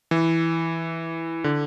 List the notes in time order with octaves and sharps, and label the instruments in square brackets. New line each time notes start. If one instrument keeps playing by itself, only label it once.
[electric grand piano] E3
D3